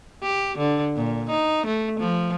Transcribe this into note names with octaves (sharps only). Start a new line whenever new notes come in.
G4
D3
A#2
D#4
A3
F3